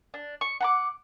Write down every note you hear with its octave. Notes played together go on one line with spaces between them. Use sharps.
D4
C#6
F#5 A#5 D6